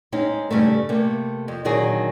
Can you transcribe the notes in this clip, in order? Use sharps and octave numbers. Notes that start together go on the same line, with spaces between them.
G#3 C4 C#4 D#4 G#4
G2 C#3 G3 A3
C3 A3 A#3
F2
A#2 D3 D#3 F#3 G#4